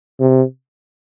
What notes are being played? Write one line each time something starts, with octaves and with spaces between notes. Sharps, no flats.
C3